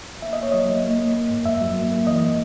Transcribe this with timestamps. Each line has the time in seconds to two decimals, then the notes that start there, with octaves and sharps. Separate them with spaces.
0.22 A#3 E5
0.33 D#5
0.38 A#3 C#5
0.52 F#3 D#5
0.69 A#3
0.84 A#3
0.99 A#3
1.15 A#3
1.30 G#2
1.46 F#2 E5
1.61 F#3
1.76 A#3
1.91 A#3
2.07 E3 D#5
2.22 G#3